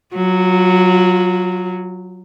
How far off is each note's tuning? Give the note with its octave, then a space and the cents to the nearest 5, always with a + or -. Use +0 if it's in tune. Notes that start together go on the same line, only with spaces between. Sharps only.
F#3 +0 F4 +25